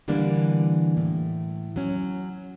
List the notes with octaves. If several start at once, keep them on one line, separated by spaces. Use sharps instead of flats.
D3 E3 G3 A#3 D4
A2
F#3 C#4